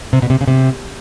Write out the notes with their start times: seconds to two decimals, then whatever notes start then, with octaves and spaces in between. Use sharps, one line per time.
0.13 C3
0.22 B2
0.30 C3
0.41 C#3
0.48 C3